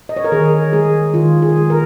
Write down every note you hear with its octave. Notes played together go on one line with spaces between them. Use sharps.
D#5
C#5
A#4
D#3 G#4
G#3 G#4
D#3 F4
G#4
G#3
A#4